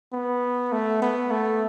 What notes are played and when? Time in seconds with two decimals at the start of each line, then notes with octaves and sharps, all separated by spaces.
0.13 B3
0.72 A3
1.02 B3
1.31 A3